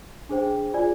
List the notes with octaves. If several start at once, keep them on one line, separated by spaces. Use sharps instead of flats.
D4 G#4 C5 G5
F4 G#4 D5 G#5